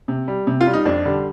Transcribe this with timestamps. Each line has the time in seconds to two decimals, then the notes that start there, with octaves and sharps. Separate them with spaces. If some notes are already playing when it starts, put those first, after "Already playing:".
0.08 C3
0.28 G3
0.47 C3
0.61 F4
0.67 G3
0.73 D#4
0.85 F2 D4
1.05 D3 G3